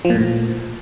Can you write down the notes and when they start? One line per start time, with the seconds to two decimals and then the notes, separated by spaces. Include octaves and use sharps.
0.05 F3
0.10 A#2
0.15 A2
0.21 A#2